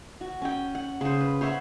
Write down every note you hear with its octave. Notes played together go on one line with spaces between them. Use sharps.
F#4
C#4 G5
F#5
C#3 C5
B4
C5 C#5 E5 F#5